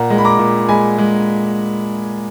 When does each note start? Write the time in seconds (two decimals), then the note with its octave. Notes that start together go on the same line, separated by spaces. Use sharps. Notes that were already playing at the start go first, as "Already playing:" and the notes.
Already playing: A#2 F#5 A#5
0.10 G#3
0.18 B5
0.25 A#5 D6
0.39 A#2
0.69 G#3 G#5 B5
0.98 G#3